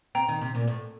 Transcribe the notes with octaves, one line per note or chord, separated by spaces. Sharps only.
C4 G5 A#5
D#3
C3
A#2
A2